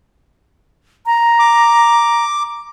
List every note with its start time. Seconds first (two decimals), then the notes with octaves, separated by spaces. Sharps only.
1.06 A#5
1.39 D6